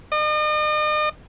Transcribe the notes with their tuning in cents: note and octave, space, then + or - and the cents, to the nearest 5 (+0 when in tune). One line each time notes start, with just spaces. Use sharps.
D#5 -40